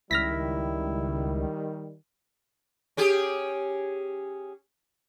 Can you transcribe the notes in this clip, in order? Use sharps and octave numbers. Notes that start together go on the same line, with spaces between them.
C#2 D#3 G3 E4 F6 A#6 B6
C#4 G4 G#4